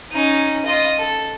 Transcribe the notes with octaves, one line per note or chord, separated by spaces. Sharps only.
C#4 D#4
F4 D#5
A4